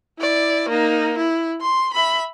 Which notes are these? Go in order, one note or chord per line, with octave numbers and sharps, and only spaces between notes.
E4 D5
A#3 D#4
E4
C6
E5 B5